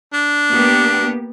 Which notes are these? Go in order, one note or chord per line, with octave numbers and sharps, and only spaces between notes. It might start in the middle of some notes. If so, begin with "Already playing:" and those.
D4
A#3 B3 G4